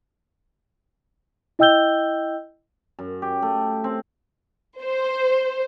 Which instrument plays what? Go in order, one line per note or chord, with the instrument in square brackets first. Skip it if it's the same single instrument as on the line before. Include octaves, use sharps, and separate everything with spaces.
[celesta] E4 D#5 G5 E6 G6 G7
[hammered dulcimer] F#2
G4
A3
C4
[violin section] C5